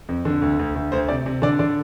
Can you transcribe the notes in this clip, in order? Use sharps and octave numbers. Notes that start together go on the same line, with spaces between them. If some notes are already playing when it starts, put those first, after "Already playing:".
F2
D3
D2
D2
D2
D2 C5
C3 D5
C3
D3 D5
D3 D5